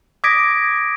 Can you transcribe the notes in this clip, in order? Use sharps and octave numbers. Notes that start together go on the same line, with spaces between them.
D6 D#6 G#6 A#6 B6 D7